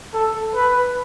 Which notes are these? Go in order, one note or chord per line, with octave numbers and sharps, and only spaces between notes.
A4
B4